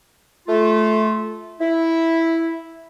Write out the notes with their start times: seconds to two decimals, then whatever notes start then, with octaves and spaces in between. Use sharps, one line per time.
0.48 A3 F4
1.60 E4